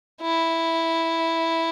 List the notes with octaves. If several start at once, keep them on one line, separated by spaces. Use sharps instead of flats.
E4